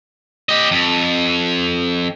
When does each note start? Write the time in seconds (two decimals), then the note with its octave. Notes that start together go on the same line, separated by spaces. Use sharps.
0.49 G4 D#5
0.71 F2